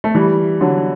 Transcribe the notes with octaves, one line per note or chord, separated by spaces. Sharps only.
A3
E3 G3
D3 F#3